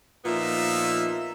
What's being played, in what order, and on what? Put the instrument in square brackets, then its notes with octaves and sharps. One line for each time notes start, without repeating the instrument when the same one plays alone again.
[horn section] A#2 F3 B3 D#4 E5